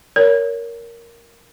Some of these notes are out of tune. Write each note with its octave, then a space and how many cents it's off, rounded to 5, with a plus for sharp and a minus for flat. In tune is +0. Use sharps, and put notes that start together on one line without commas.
A#4 +0 C#5 +20